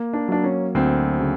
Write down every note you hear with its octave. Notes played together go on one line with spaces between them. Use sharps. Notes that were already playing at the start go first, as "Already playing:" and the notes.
Already playing: A#3
D4
F#3 D4
C#4
D2 C4
C#3